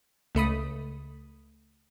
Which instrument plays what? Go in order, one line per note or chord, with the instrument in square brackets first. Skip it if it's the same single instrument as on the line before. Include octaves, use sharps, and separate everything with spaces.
[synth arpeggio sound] C#2 A3 B5 D#6